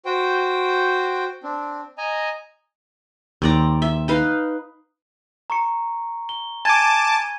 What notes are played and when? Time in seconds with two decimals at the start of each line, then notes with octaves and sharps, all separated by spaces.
0.05 F#4 C5 G5
1.43 C4 D4
1.98 D#5 G#5 A#5
3.42 D#2 C4 D5 A#5
3.82 E5
4.08 D#4 B4 F5
5.50 A#5 C#6 C#7
6.29 G7
6.65 G#5 A5 D6 G#6 D#7